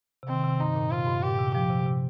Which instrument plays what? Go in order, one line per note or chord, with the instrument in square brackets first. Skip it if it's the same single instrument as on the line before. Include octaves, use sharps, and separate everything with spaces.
[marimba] C3
[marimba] D#3 [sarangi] C4
[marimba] C3
[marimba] G2 [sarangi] D#4
[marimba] A#2
[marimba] C3 [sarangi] F4
[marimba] G2
[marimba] A#2 [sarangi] G4
[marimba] C3
[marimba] F3 [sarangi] G4
[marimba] C3
C3